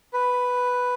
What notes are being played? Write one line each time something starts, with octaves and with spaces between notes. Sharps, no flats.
B4